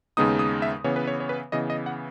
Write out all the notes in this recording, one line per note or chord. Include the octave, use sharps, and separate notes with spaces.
D#2 C#3 G#3 B3 D#4 D#6
D#6
E5
C#3 E3 B3 C#5
B4
C#5
C#5
B4
C#3 E3 B3 D#5
D#5
F#5